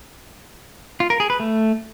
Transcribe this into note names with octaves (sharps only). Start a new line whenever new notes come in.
F4
A#4
G#4
B4
A3